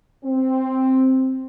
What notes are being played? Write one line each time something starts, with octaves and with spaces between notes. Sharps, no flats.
C4